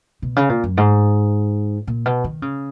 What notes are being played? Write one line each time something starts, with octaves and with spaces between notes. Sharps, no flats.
B2
C#3
A#2
F#2
G#2
A#2
B2
D#3
C#3